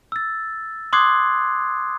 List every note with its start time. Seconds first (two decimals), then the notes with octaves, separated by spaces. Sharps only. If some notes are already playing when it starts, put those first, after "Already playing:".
0.12 E6 A6
0.93 C6 D6 D#6 F#6 G#6 C7